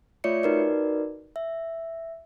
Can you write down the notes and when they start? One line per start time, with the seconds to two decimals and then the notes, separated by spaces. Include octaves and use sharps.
0.24 A3 F4 C#5 D5 E5 C#7
0.43 D#4 F#4 A#4 B4 D5
1.36 E5